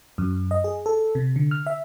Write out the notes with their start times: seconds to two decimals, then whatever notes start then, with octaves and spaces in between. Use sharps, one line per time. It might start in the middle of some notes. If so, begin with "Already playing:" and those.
0.18 F#2
0.51 D#5
0.64 G#4
0.86 A4
1.15 C3
1.36 D3
1.51 F6
1.67 E5